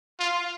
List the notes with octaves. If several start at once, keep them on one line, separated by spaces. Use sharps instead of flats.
F4